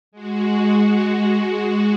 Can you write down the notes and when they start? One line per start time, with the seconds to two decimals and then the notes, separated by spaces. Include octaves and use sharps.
0.12 G#3 F#4